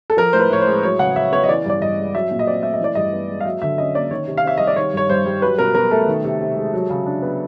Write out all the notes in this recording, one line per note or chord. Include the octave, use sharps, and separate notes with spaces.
A4
F3 A#4
A2 C5
B4
A2 C#5
C5
G#3
F#3 C#5
C#3 F#5
C#3 E5
B3 C#5
D#5
E3 D5
G2 D5
G2 D#5
G#3
F#3 E5
A#2
D#5
C4 D5
A3 E5
D#5
E3 D5
G2 D#5
B3
G#3
F5
F#3 E5
D3 E5
C#4 D#5
A#3 D5
D#3 C#5
C3
F5
C4 E5
G3 D#5
D5
D#3 C#5
G2 C#5
G2 C5
G3
F#3 B4
B2 A#4
B2 A#4
A3 A4
D#3
C3
C3
G#3
F#3
C#3
D4
B3